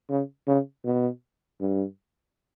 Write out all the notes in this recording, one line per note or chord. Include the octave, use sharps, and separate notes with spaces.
C#3
C#3
B2
G2